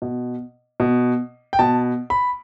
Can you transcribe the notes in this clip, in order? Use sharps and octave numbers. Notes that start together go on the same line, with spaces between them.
B2
B2
G5
B2 A5
B5